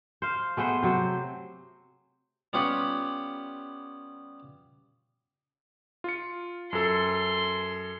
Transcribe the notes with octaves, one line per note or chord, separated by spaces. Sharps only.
C5 F5
A3 B3 G#4 C5
C3 F#3 C5
G3 B3 C#4 F4 G4 F#5
F4 C#7
F#2 A4 C6